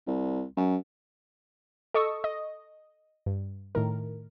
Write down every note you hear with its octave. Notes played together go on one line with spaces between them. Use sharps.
C2
F#2
A4 D#5 C#6 D#6 E6
D#5
G2
A2 D#3 A#4